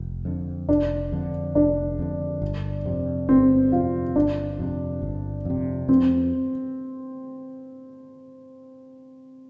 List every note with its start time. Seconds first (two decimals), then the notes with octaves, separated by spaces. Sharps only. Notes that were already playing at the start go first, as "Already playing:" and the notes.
Already playing: F1
0.25 F2 D3
0.68 F1 D4
1.12 F2 D3
1.55 F1 D4
1.99 F2 D3
2.42 G1
2.86 F2 C3
3.29 G1 C4
3.72 F2 C3 F4
4.16 G1 D4
4.59 F2 C3
5.02 G1
5.45 F2 C3
5.89 F2 C4